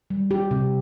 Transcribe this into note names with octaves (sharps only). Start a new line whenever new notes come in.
G3
G4
C3